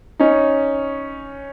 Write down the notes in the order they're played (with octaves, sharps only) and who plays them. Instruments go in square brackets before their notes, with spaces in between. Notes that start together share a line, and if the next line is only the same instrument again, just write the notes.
[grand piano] C#4 D#4